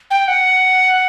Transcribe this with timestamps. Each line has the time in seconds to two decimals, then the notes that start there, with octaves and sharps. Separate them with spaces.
0.11 G5
0.28 F#5